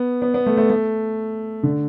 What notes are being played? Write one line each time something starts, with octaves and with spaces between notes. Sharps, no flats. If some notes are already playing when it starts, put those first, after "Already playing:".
Already playing: B3
B3
B3
A3
A3
A3
D3